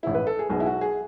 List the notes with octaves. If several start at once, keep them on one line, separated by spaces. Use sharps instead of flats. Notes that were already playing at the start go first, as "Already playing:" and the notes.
A1 G#2 G#3 E4
B4
A4
G#4
B1 B2 G#3 G#4
E4
F#4
G#4